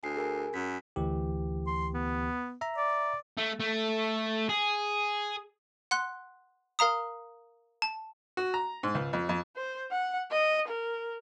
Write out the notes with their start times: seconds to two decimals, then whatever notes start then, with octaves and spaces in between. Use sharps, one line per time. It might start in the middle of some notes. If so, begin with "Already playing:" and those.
0.03 D2 G#5 C7
0.17 G#4 A#4 G#5
0.54 F#2 B6
0.96 D2 E3 G4
1.67 C6
1.94 B3
2.61 E5 A#5
2.77 D5
3.37 A3
3.60 A3
4.49 G#4
5.91 F#5 C6 F#6
6.79 A#4 F5 A#5 D#6
7.82 A5
8.37 F#4
8.54 A#5
8.83 G#2
8.95 C#2
9.13 F2
9.29 F2
9.56 C5
9.91 F#5
10.31 D#5
10.68 A#4